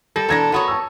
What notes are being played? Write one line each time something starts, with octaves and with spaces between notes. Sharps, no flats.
G3 A4 A#6
B2 E3 D4 A#5 G#6 A#6
B3 F#4 C#5 A#5 B5 D#6
A5 E6